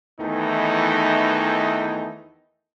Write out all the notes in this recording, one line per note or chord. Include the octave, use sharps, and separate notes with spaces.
E2 D#3 E3 A3 D#4